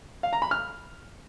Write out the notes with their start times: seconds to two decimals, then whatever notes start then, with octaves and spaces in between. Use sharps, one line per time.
0.23 F5
0.33 A#5
0.42 B5
0.51 F6